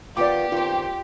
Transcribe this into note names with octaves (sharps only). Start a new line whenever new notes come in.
D#3 B3 F4 G4 D5 D6
D#3 C4 F4